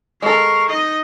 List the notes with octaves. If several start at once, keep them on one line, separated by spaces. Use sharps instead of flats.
G#3 A4 A#4 F5 C#6
D#4 D#5